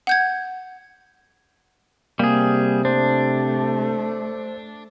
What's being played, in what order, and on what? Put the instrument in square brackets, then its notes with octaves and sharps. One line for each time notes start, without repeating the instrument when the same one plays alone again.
[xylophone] F#5 G6 G#6
[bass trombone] C3 [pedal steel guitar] G3 G#4 [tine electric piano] A#3
[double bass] A3 [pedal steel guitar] D4 [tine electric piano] C5